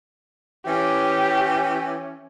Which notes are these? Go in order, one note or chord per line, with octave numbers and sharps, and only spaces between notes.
E3 C#4 G4